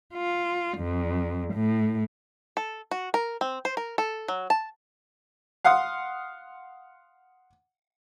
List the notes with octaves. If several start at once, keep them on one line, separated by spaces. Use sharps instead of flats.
F4
F2
A2
A4
F#4
A#4
C4
C5
A#4
A4
F#3
A5
F5 F#5 C6 D#6